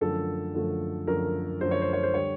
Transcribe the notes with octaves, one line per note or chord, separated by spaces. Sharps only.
F#2 D3 F3 A3 A4
F#2 D3 F3 A3
F#2 D3 F3 A3 A#4
F#2 D3 F3 A3 C5
C#5
C5
C#5
C5
D3 G3 C#5